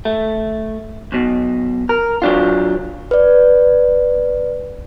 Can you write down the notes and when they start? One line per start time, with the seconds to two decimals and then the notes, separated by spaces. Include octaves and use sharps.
0.05 A3
1.12 B1 B2
1.89 A#4
2.22 F#3 D4 F4
3.11 B4 D5